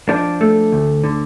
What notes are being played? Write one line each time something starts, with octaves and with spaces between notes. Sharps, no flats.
F3 D4
A3
D2
D3